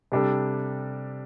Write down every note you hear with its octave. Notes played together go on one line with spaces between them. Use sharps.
C3 G3 D4 A4